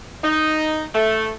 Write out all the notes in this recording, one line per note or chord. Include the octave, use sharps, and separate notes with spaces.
D#4
A3